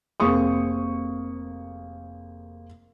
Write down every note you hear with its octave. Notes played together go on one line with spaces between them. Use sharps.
F1 A#3 C4 G#4 C#6 D#6